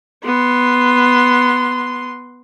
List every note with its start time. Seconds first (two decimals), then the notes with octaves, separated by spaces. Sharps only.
0.24 B3 C6